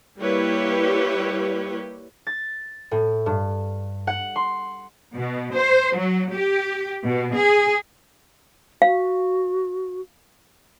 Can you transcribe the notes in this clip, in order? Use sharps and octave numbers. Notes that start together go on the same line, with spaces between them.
G3 A#3 E4 G4 B4 C#5
A6
A2
G2
F#5
C6
B2
C5
F#3
G4
B2
G#4
F#4 F5